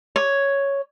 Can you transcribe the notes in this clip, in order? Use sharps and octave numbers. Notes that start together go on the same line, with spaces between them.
C#5